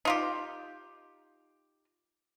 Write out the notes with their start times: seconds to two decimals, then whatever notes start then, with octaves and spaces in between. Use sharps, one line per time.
0.05 D#4 F4 G4